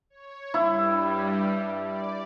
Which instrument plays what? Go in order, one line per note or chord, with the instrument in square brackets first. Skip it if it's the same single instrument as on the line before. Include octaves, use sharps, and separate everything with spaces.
[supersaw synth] C#5
[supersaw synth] G2 G3 [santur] E4
[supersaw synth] D5